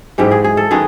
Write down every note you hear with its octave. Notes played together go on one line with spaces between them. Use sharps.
G#2 E3 G#3 G4
G#4
G#4
A4
D#3 G#3 B3 G#4